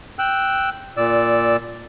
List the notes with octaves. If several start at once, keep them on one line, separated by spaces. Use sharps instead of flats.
G5 E6 F#6
A#2 D5 E6